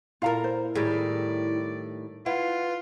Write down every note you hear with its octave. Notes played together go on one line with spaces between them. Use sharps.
A#2 E4 F4 A4 A#4 F5 A#5
C5
A2 D#3 G3 G#4 D5
E4 F4 B4 F#5